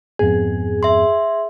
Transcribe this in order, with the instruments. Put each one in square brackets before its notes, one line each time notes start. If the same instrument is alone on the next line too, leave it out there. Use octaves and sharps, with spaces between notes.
[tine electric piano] F2 G#2 B3 [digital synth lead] G#4
[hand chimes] E5 C6